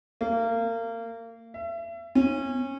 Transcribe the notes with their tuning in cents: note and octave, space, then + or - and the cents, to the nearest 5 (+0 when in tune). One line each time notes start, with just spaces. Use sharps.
A#3 -30
E5 +35
C#4 -25